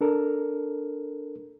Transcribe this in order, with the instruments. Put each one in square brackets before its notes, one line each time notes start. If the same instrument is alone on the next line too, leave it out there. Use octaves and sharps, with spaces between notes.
[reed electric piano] D4 A4 A#4